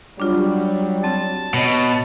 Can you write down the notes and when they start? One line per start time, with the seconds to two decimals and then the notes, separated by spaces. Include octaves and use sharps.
0.20 F#3 G3 D4 F4
1.04 C4 A5
1.54 B2 C#5 D#5